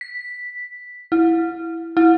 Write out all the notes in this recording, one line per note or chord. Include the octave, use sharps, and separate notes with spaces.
B6
E4
E4